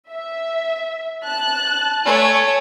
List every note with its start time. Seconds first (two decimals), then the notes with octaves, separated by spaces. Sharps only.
0.11 E5
1.24 A5 F#6
2.05 A3 C#5 G#5